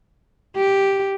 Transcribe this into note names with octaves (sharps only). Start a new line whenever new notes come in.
G4